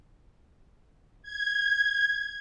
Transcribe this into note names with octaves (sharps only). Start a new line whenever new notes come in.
G#6